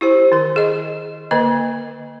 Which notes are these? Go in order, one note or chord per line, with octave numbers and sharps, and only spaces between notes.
E4 G4 C5
D#3 A#4
G#4 D#5
D3 A#3 A#4 D#5